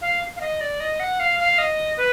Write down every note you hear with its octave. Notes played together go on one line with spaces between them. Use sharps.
F5
F5
D#5
D5
D#5
F#5
F5
F5
D#5
B4